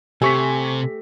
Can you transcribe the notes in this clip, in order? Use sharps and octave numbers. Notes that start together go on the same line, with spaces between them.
C3 A3 C4 G4 G#5 C#6 B6